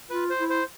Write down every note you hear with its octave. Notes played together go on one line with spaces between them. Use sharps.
F4 B4
C5
E4
C5